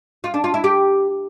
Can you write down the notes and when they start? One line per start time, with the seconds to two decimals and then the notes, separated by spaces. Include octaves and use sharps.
0.24 F4
0.34 D4
0.44 F4
0.54 E4
0.64 G4